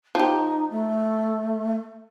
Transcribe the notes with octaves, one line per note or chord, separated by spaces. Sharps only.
F3 D#4 G4
A3